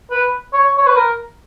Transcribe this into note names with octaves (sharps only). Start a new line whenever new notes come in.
B4
C#5
C#5
B4
A#4